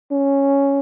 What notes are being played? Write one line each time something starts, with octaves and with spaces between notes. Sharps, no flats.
C#4